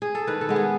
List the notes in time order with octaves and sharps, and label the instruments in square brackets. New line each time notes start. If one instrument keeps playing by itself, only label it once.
[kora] G#4
A4
D#3 B4
A4
G#3 B3
G#4